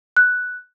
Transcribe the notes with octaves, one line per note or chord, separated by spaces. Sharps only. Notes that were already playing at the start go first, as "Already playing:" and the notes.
F#6